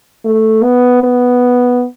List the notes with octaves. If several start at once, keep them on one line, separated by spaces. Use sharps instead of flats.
A3
B3
B3